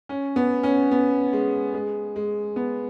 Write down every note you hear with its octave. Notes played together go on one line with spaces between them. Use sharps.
C#4
B3
C#4
B3
G#3
G#3
G#3
B3